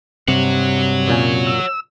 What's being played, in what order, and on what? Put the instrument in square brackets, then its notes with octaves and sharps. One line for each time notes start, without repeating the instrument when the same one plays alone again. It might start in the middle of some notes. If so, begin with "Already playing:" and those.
[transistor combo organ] G2 [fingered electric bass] C3 [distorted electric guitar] C#5 F#5
[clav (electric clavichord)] F#2 A#2 G#5
[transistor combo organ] E6